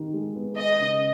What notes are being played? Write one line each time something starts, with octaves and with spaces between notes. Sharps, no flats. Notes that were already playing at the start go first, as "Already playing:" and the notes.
Already playing: D#3 G4
G#3
B3
G#4 D#5
C#3